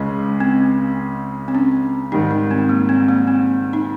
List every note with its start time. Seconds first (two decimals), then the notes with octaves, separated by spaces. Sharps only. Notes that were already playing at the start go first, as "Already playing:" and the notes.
Already playing: C#2 C#3 G#3
0.40 C4
1.48 C4
1.55 C#4
2.12 G#2 D#3 G3 D#4
2.31 D#4
2.51 C4
2.69 A#3
2.89 C4
3.08 A#3
3.27 C4
3.73 D#4